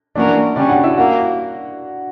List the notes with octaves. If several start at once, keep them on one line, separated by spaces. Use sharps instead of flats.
E3 A#3 C#4 D4 F#4 A#4 D5
C#3 G3 C#4 D4 D5
F#4 F#5
E4 E5
A#3 F#4 F#5